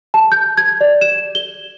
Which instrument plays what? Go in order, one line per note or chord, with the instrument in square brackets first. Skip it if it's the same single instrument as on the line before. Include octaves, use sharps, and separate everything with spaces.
[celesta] A5
G6
G#6
D5
E7
G7